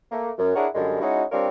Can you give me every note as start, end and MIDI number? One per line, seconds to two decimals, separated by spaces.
0.12 0.31 57
0.12 0.31 58
0.39 0.52 42
0.55 0.67 62
0.55 0.67 64
0.55 0.67 68
0.55 0.67 70
0.55 0.67 73
0.55 0.67 78
0.75 0.98 42
0.75 0.98 50
0.75 0.98 55
0.75 0.98 56
1.01 1.24 56
1.01 1.24 61
1.01 1.24 63
1.01 1.24 64
1.01 1.24 66
1.32 1.49 55
1.32 1.49 60
1.32 1.49 62
1.32 1.49 65
1.32 1.49 70
1.32 1.49 73